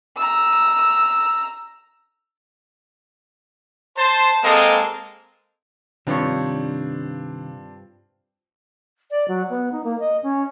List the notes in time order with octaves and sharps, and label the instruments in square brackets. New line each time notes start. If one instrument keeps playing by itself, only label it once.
[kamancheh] A#5 E6
[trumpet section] C5 A5
G#3 A#3 C4 A4 D#5
[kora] G2 F3 C#5 [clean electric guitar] C3 D#3 [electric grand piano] C4 D4 F5
[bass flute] D5
F#3
B3
D#4
A#3
D#5
C#4